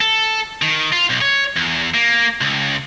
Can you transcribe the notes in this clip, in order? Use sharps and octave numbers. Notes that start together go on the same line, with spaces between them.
A4
D#3
F4
B1
C#5
E2
A#3
C#2